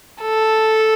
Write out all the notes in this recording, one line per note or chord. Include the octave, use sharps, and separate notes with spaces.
A4